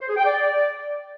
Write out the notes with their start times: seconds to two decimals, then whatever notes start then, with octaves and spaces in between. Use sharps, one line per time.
0.01 C5
0.09 G#4
0.17 G5
0.25 D5